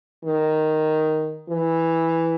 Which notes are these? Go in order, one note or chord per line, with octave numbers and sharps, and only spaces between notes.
D#3
E3